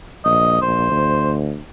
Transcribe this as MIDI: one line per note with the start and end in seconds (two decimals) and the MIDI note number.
0.25 0.60 34
0.25 0.59 75
0.62 0.90 34
0.62 1.36 72
0.91 1.57 38